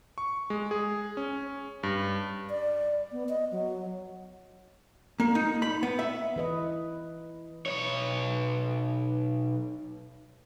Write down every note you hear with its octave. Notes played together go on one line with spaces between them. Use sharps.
C#6
G#3
G#4
C#4
G2
D5
B3
D#5
F#3
A#3
D#4
B5
B3
E5
E3 B4 D#5
B1 C#5